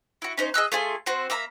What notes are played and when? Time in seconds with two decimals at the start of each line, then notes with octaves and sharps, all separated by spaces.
0.22 E4 F#4
0.38 C#4 D#4 C5
0.54 G#4 D#5 E6 F#6
0.72 A3 F4 G#4 G#5
1.06 C4 F#4 C5
1.30 A#3 E5 A#5 B5